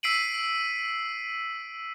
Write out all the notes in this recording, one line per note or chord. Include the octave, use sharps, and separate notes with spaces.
E6 B6 C7 D7 D#7 F#7